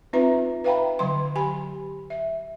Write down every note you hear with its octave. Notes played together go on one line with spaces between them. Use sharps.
C4 D#4 F4 B4 E5 A#5
B4 E5 F5 G5 A#5 B5
D3 F#3 C6
G4 G#5 B5
E5